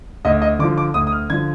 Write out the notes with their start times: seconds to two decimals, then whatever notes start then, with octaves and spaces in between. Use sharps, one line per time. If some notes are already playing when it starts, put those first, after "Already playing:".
0.25 D2 D#5
0.42 D#5
0.59 D3 D6
0.64 F3
0.78 D6
0.94 D2 D#6
1.07 D#6
1.12 F6
1.30 D3 F3 G#6